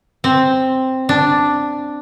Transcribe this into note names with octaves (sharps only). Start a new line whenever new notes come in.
C4
D4